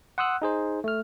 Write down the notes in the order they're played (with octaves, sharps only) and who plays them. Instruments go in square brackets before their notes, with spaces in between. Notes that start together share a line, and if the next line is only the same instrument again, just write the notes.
[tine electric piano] F#5 C6 D#6 E6 F#6
D#4 G#4 C5
A3 F6